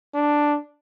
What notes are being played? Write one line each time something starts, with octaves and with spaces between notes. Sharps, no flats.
D4